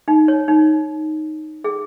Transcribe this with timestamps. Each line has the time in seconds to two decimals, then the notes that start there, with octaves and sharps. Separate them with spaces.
0.08 D#4
0.28 C#5
0.48 D#4
1.64 G#4